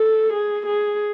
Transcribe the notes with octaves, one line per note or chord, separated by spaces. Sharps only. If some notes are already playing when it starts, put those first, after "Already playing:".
Already playing: A4
G#4
G#4